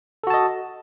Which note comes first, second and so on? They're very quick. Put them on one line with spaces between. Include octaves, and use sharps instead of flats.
A4 F#4 A5 D#5